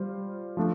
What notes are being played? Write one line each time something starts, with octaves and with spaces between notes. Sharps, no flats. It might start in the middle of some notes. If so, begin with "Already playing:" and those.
Already playing: G3 F4 C5
F3 A3 D4